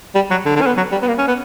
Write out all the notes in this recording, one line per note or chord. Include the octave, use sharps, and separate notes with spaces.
G3
F#3
D3
D3
C#4
B3
F#3
G3
B3
A#3
C#4
B3